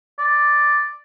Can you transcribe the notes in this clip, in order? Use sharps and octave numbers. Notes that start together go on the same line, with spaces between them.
D5